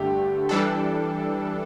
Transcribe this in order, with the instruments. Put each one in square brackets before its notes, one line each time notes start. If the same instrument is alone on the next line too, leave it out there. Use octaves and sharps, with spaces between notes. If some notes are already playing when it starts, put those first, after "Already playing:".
Already playing: [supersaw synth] G2 D3 A3 [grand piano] G4
[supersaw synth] E3 G3 D4 A4